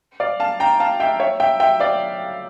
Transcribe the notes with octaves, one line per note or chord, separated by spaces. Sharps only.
D5 F5
F5 A5
G5 A#5
F5 A5
E5 G5
C#5 E5
E5 G5
E5 G5
D5 F5